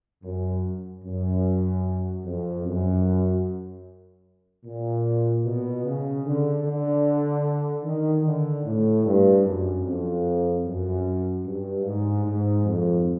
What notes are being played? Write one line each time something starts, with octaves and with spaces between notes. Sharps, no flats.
F#2
F#2
F2
F#2
A#2
B2
C#3
D3
D3
D#3
D3
A2
G2
F#2
F2
F#2
G2
G#2
G#2
F2